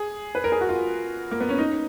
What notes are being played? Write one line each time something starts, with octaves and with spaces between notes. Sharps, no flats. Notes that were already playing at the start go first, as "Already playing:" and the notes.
Already playing: G#4
B4
A#4
G#4
F#4
F4
A#3
B3
C#4
D#4